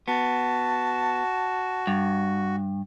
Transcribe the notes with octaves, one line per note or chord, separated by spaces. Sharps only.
B3 F#4 A5
G2